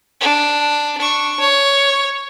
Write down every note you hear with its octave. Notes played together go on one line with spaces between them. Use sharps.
D4
D4 C#6
C#5